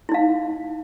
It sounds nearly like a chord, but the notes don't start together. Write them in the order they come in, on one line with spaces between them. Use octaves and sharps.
E4 D#4 F5